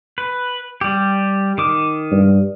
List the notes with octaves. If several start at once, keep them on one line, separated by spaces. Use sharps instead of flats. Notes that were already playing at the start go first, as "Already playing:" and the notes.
B4
G3 G4
D#3 D6
G2